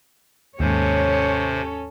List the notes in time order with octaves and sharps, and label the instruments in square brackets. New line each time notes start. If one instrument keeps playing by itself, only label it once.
[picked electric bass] D#2 G#2 [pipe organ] C3 C5 [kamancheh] C#4 A4 [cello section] C#5